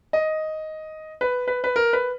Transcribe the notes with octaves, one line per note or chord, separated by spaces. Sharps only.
D#5
B4
B4
B4
A#4
B4